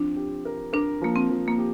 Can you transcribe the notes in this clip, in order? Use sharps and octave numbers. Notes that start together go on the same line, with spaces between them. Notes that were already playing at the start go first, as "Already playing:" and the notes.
Already playing: F3 C4 D4
G4
A#4
D4 A#4
F3 A#3
C4
F3
A#3
G4